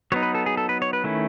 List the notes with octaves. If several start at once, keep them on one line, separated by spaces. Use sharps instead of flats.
F#3 B3 D#4 C#5
B4
A4
G#4
A4
B4
C#5
B4
D#3 A3 C#4 E4